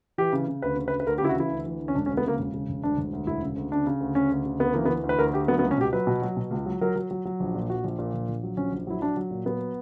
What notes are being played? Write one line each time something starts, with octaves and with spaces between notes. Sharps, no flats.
E3 G4
C#3
C#3
D2 B4
C#3
B4
D2
B4
D2 A#4
G4
C#3 E4
F#4
E3 E4
D2
E3
D2
C#4
E1 D4
C#4
D2
B3
C#3 A#3
E1
C#3
E1
D2 D4
E1
D2
E1 E4
C#3
D2
C#3 D4
C#3
D2
C#3 C#4
D2
C#3
D2 B3
E3 A#3
B3
E3
D2
B4
D2 A#4
D2 G4
F#3 B3
B3
C#2
C#4
B2 G4
F#3 B4
B2
F#3
B2
C#2
F#3
F#3 A#4
F#3
F#3
F#3
A#1
A#2
A#2 F#4
A#1
A#2
A#1
A#1
F#3
A#1 C#4
A#1
F#3 E4
F#3 D4
F#3
A#2
F#3 B3